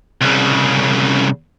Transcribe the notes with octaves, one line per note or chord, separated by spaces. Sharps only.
C2 C#3